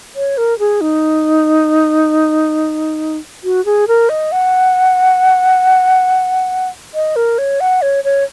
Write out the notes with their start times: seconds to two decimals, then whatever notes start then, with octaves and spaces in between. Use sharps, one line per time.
0.16 C#5
0.37 A#4
0.59 G#4
0.81 D#4
3.44 F#4
3.65 G#4
3.88 A#4
4.09 D#5
4.32 F#5
6.95 D#5
7.16 A#4
7.38 C#5
7.60 F#5
7.82 C#5
8.04 C#5